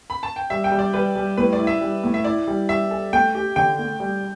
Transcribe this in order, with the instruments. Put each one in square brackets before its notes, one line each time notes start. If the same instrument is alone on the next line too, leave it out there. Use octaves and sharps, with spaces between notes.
[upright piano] B5
A5
G5
[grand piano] G3 [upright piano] E5
[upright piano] G5
[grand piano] G3
[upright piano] D5
[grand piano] G3 [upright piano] B4
[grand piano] G3
[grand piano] A2 [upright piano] B4
[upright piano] D5
[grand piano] E4
[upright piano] E5
[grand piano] G3
A2
[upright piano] E5
[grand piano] E4 [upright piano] D5
[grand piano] G3
[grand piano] G3 [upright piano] E5
[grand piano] A4
[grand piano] A3 [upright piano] G5
[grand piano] G4
[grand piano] D3 [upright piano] G5
[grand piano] A3
G3